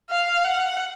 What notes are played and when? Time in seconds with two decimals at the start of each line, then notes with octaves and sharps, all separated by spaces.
0.10 F5
0.44 F#5